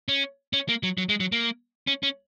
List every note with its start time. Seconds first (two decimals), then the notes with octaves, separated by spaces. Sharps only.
0.08 C#4
0.53 C#4
0.69 A#3
0.83 F#3
0.98 F#3
1.09 G#3
1.20 F#3
1.32 A#3
1.87 C#4
2.03 C#4